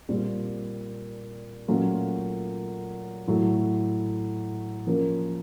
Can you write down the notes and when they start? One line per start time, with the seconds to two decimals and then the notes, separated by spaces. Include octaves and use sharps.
0.09 A#2 G3 C4
1.68 A#2 F#3 A3 C#4 F4
3.27 A2 F#3 A3
4.87 F3 A#3 C#4